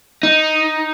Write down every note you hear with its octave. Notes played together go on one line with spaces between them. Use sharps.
D#4